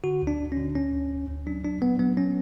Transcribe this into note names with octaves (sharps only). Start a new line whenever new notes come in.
D3 F#4
D2
D4
D2
D3 C#4
D2 C#4
D2
D2
D2
F#3 D4
F#3 D4
F#3 B3
F#3 B3
F#3 C#4